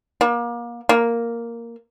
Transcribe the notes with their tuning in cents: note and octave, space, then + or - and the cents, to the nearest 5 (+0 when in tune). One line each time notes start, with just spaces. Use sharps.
A#3 +30
A#3 +0